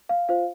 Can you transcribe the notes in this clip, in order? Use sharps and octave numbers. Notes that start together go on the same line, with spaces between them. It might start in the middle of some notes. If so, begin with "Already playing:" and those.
F5
F4 C5 F5